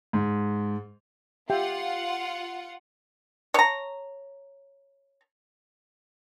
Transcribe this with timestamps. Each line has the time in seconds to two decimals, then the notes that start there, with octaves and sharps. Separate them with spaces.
0.13 G#2
1.50 F4 G4 E5 F#5 G5
3.54 C#5 A#5